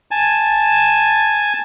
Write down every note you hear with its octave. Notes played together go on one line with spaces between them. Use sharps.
G#5 A5